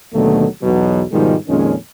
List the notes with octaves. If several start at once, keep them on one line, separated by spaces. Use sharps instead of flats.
D#2 B2 D3 D#3 F#3 A3
B1 E2 B2 F#3
G#2 B2 D#3 F3 G3 G#3
F2 A#2 D#3 G#3 C#4